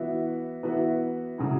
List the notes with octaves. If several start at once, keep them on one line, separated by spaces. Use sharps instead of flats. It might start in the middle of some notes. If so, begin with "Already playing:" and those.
Already playing: E3 B3 F#4 E5
E3 B3 F#4 E5
C#3 F#3 E4